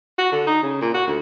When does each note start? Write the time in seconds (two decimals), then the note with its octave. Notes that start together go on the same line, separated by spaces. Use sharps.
0.18 F#4
0.32 D3
0.47 D#4
0.63 C#3
0.81 A#2
0.94 F#4
1.07 D2